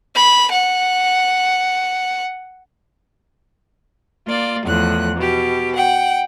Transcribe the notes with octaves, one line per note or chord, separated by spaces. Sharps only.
B5
F#5
A#3 F4 D5
E2 A2 F3 F#6
B2 G4
F#5 G5